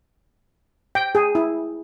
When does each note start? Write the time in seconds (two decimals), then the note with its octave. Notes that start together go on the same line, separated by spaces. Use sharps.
0.95 G5
1.15 G#4
1.35 E4